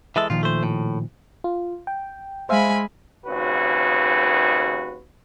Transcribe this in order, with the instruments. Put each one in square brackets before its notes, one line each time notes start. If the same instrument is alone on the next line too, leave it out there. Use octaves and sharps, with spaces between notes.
[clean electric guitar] E3 G#3 A4 [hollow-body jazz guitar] E5
[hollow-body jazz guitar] A#2 D#3 F3 [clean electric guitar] F4
[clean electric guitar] A3 C5
A2
[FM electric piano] F4
G5
[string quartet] G#3 G#5 B5 [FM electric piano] C5 E5 F5
[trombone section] G#1 D#2 C#3 F#4 B4